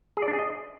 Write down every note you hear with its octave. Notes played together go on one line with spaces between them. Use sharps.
G#4
D5
D4
G#4
D#5